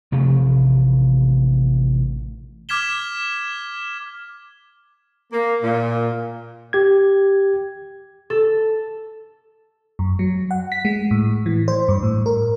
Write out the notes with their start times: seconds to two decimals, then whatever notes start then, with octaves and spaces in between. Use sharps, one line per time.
0.12 A1 C3 F3 A3
2.69 D6 F6 G#6 B6 E7 G7
5.31 A#3
5.62 A#2
6.73 G4 G#6
8.30 A4
9.99 F#2
10.19 F#3
10.51 F#5
10.72 B6
10.85 G#3
11.11 A2
11.46 E3
11.68 C5
11.88 G2
12.03 A2
12.26 A#4